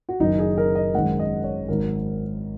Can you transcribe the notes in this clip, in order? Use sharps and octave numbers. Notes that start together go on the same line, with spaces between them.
F#4
F#1 F#2 D#3 D#4
G#4
A#4
D#5
G#1 F#2 D#3 G#3 F#5
D#5
C#5
G#1 G#2 F#3 A#4